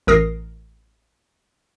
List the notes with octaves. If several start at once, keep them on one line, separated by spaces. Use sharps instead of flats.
A1 A#4 D#6 A#6 C7